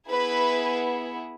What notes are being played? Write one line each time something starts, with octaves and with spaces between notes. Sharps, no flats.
B3 E4 G#4 B4